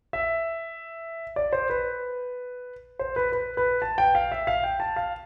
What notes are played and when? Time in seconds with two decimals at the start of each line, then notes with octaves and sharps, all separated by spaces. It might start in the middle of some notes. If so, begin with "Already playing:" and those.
0.13 E5
1.36 D5
1.53 C5
1.70 B4
2.99 C5
3.16 B4
3.32 B4
3.57 B4
3.82 A5
3.98 G5
4.15 F5
4.32 E5
4.47 F5
4.63 G5
4.80 A5
4.96 F5